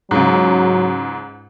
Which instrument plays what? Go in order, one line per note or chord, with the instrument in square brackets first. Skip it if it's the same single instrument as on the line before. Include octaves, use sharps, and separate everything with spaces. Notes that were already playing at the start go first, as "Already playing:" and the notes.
[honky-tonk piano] C#2 G#2 [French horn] F#3